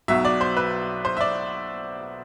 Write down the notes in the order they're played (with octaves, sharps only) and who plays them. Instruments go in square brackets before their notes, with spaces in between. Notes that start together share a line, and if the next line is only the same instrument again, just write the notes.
[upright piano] B1 B2 F#3 E5
D5
C5
B4
C5
E5
D5